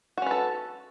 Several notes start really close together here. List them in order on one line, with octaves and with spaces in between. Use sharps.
F#4 C#4 B4 A4